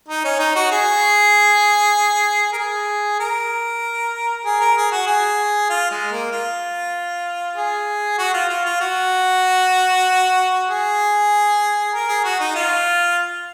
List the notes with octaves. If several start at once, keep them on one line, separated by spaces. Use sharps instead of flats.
D#4
C#4
D#4
F#4
G#4
A#4
G#4
A#4
G#4
A#4
G#4
F#4
G#4
F4
G#3
A#3
F4
G#4
F#4
F4
F4
F4
F#4
G#4
A#4
G#4
F#4
D#4
F4